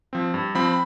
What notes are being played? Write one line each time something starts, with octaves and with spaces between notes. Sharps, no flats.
F3 C4
G2
F3 C4 B5
B5